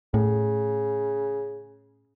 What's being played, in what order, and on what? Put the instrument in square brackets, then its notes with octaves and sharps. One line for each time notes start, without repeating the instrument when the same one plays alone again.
[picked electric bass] A2 [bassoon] C#3